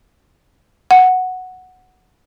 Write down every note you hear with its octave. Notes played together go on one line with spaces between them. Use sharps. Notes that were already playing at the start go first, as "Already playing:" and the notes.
F#5